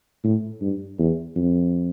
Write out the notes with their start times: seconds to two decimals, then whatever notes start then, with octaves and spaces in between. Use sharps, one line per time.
0.24 A2
0.61 G2
0.99 E2
1.36 F2